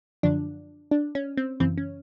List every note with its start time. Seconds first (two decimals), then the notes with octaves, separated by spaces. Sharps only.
0.23 F#2 D3 F3 D4
0.91 D4
1.15 C#4
1.37 C4
1.60 F#2 C#3 E3 C4
1.78 C#4